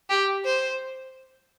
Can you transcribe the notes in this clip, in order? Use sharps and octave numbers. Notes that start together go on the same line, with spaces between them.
G4
C5